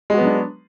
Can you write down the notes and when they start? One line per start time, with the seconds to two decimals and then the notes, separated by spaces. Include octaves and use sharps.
0.10 G#3
0.14 F#4
0.18 B3
0.21 F#3
0.25 D4